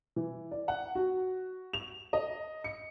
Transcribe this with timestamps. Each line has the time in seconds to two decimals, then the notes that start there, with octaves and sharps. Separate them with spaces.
0.16 E3
0.51 D5
0.68 F#5
0.95 F#4
1.73 F7
2.13 D#5
2.64 C#7